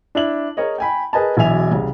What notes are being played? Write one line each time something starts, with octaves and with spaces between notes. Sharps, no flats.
D4 E4 F#7
G#4 A#4 C#5 D#5
G5 G#5 B5
G#4 A#4 B4 D#5 G#5 A5
E1 B1 E2 E5 G#5 F7
C2 C#3